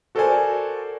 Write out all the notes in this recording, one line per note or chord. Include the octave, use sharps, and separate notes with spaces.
F#4 A4 A#4 C5 D5 G#5